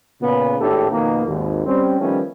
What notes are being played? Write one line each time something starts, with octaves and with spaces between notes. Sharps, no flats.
A#2 C#3 B3
G#1 A2 D4 G4 A4
F2 B2 D#3 A#3
G#1 D#2
G3 C4 C#4
D#3 F3 G3 A3 B3 C#4